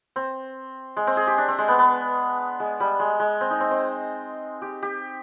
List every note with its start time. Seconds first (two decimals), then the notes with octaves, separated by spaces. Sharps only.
0.16 C4
0.97 G#3
1.07 C4
1.17 G#4
1.27 G4
1.38 D4
1.48 C4
1.58 G#3
1.68 B3
1.79 B3
2.60 G#3
2.80 G3
2.99 G#3
3.20 G#3
3.41 C4
3.50 D#4
3.60 C4
3.71 C4
4.62 G4
4.83 G4